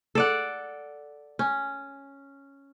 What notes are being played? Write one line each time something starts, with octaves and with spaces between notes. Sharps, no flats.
A4 D5 F#5
C#4